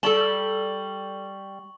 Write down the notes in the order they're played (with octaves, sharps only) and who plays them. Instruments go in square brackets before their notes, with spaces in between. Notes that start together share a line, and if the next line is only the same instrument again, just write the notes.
[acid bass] G3 [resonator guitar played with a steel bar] A4 D5 A5 [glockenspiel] C#6 F#7 G7